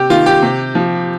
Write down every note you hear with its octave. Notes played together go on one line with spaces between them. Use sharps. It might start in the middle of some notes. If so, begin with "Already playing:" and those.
Already playing: C3 G4
D#3 F4
G4
C3
F3